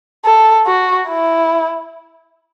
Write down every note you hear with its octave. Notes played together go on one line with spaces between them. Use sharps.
A4
F#4
E4